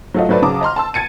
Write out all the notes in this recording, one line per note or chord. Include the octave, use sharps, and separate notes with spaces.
F#3 A3 F4 D#5
F#3 A3 B4 C5 D5
C#3 F#3 A5 A#5 D6 D#6
D#5 A#5 C6 F6
A5 C6 E6
A5 G#6 A6 C#7 D#7